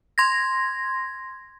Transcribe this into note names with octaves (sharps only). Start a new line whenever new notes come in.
C6 G#6 A#6